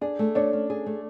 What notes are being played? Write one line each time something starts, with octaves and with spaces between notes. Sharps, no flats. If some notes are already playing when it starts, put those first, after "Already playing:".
D4 G#4
A3
D4 C#5
C#4
G#4
A3